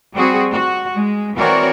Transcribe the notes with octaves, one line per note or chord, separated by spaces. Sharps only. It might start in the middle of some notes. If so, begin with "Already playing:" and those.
G3 C4 F#4 G#4
F#4
G#3
E3 C4 F#4 A#4 C#5 D5